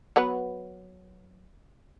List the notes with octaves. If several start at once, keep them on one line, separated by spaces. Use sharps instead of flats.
F#3 B3 B4